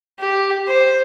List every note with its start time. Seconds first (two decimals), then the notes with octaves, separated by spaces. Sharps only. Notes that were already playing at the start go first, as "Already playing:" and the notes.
0.20 G4
0.67 C5